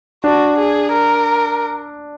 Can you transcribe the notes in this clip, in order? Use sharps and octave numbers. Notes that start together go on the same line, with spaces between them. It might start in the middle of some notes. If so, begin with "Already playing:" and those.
D4 F#4
G#4
A#4